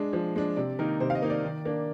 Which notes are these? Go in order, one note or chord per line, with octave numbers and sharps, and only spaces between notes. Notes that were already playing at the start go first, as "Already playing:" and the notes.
Already playing: G#3 D4
F3
G#3 D4
C3 D5
D#3 A#3 D#4 A#4
C3 C5
F5
D#5
D#3 A#3 D#4
D5
D#3
A#3 D4